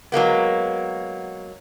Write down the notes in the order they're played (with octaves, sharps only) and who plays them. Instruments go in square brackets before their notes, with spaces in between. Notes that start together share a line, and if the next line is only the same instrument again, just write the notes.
[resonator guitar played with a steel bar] F#3 G#3 A#3 B3